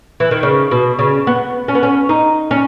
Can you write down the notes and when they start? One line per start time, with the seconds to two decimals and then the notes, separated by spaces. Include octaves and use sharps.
0.20 E3
0.31 D#3
0.43 C#3
0.71 B2
0.99 C#3
1.27 B3
1.68 C#4
1.75 B3
1.83 C#4
2.09 D#4
2.51 C#4